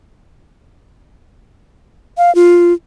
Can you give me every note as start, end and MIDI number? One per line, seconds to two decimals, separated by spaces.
2.18 2.33 77
2.35 2.73 65